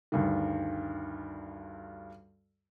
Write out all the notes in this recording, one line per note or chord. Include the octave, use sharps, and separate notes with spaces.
D2 G2 D#3